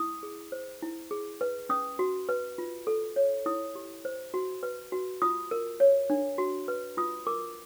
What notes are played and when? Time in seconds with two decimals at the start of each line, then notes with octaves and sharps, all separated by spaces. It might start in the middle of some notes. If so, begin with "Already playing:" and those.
Already playing: E4 D#6
0.23 G#4
0.52 C5
0.82 E4
1.11 G#4
1.41 B4
1.69 C#4 D#6
1.99 F#4
2.29 B4
2.58 F4
2.87 A4
3.16 C#5
3.46 E4 D#6
3.75 G4
4.05 C5
4.34 F#4
4.63 B4
4.92 F#4
5.22 F4 D#6
5.51 A#4
5.80 C#5
6.10 D4
6.38 F#4
6.68 B4
6.97 F4 D#6
7.27 A#4 D6